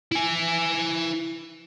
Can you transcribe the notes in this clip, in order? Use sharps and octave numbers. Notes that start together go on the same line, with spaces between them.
E4 G#5